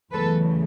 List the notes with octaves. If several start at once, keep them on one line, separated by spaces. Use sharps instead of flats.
E2 C#3 F#3 A3 A4 B4